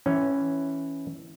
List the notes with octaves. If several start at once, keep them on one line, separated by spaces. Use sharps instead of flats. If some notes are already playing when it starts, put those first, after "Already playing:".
E3 C#4